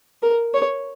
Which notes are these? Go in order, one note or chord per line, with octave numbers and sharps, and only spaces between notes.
A#4
C#5